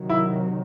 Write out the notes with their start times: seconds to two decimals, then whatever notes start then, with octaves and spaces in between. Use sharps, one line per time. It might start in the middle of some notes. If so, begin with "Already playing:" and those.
Already playing: C3 D#3 F#3
0.10 E4